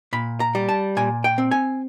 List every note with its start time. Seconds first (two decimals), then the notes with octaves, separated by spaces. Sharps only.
0.13 A#2 B5
0.40 A#5
0.55 G3
0.69 A5
0.97 A#2 G#5
1.24 G5
1.38 C4
1.51 G#5